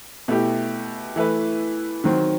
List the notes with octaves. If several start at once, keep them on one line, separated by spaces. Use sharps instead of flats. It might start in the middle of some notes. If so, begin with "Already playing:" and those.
B2 A3 E4 G4
E3 A3 E4 B4
D#3 F#3 C4